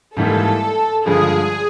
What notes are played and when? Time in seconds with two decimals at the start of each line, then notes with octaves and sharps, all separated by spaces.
0.16 G#2 E3 G3 A#3 A4
1.05 G2 D3 F3 G#3 G#4